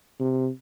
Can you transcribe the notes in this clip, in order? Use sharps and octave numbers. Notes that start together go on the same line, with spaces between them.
C3